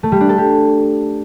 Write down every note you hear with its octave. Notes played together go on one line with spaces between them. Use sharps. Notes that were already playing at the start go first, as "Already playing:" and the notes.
A3
G3
D4
A4
G4